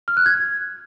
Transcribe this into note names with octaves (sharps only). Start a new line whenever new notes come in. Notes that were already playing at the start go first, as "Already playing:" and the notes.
F6
F#6
G#6